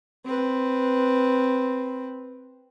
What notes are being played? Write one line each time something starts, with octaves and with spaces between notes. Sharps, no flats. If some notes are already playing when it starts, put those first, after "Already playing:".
C4 B4